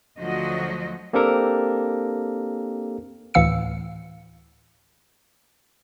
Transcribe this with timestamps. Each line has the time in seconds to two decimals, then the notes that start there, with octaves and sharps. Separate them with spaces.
0.19 D2 D3 F3 F#3 F#4 D#5
1.13 A#3 C4 D4 G4 A4 A#4
3.34 D2 A2 E3 F5 E6 C#7